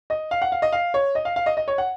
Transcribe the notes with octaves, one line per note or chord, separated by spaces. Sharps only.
D#5
F5
F#5
F5
D#5
F5
C#5
D#5
F5
F5
D#5
D#5
C#5
F#5